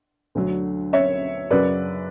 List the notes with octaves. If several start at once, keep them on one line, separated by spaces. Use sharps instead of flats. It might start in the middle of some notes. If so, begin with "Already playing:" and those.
D2 D3 F#3
C#5 E5
F#2 C#3 F#3 B4 D5